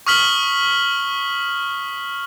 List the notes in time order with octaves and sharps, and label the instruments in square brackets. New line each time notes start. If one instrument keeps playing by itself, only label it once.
[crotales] C#6 D#6 F6 B6 F#7 G7